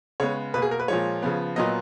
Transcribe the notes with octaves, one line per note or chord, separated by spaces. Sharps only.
C#3 G#3 B3 C#5
B2 A#3 B4
G#4
A#4
B4
A#2 F3 G#3 C#5
C#3 F3 B3
A#2 F#3 B3 D#5